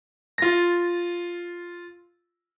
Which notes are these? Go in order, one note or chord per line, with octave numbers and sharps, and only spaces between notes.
F4 A#6